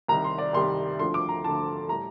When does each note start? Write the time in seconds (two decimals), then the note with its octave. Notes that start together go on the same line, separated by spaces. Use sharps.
0.08 C2 C3 D#3 G3 A#5
0.24 C6
0.38 D5
0.53 C2 C3 D#3 G3 C6
0.98 D2 D3 F3 C6
1.14 D6
1.29 A#5
1.43 D2 D3 F3 A5
1.89 A2 G3 A#5